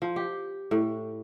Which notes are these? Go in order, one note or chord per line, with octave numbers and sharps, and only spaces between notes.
F3
G4
A2